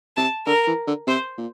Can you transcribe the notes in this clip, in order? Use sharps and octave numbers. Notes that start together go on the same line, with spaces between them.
C3 A5
D3 A#4
E3
D3
C3 C5
A#2